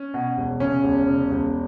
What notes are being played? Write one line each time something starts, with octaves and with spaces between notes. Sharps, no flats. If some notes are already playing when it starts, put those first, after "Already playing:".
Already playing: C#4
B2
E1
C#3 C#4
E1
C#3
E1